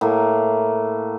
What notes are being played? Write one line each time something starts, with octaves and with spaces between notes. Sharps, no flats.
A2 A#3